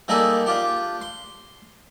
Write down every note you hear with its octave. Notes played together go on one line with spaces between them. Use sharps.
G3 A#3 D#4 G#4 A4
D4 F4 G4
C6